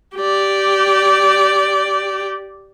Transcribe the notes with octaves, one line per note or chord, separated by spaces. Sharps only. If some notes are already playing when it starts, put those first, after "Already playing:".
G4 D5